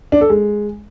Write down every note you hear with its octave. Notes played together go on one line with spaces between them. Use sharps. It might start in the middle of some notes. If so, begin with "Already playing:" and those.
D4
A4
G#3